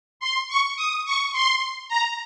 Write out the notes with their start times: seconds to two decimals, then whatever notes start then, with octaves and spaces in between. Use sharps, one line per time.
0.20 C6
0.48 C#6
0.76 D#6
1.05 C#6
1.32 C6
1.89 A#5